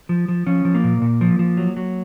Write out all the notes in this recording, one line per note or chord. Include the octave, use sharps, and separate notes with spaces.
F3
F3
F3 C#4
F3
A#3
A#2
A#2
F3
F3
F#3
F#3